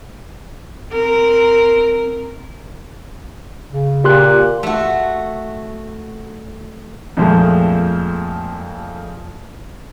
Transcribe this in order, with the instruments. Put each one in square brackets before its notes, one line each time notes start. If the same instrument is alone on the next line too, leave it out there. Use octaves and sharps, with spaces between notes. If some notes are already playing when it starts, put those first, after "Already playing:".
[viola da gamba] C4 A#4
[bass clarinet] C#3
[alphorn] A#2 [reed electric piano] G4 C6 F#6
[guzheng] A3 F#4
[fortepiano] F2 A#2 F3 G#3 A3